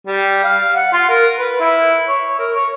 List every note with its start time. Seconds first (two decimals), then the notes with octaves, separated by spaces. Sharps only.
0.07 G3
0.44 F5
0.76 F#5
0.93 F4
1.09 A#4
1.39 B4
1.60 E4
2.08 C#5
2.39 A#4
2.55 C#5